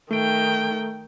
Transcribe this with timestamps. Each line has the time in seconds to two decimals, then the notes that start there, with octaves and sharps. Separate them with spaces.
0.11 D#3 A3 G5 D7